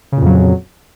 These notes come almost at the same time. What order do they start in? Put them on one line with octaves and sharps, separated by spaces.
C#3 A#2 F2 F#3